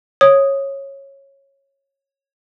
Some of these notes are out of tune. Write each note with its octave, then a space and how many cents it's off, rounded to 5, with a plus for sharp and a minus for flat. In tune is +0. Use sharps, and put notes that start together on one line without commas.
C#5 -15 D#6 +0